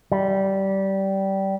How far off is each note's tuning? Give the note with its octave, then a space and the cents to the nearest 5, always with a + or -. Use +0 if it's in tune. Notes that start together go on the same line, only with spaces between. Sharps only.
G3 -20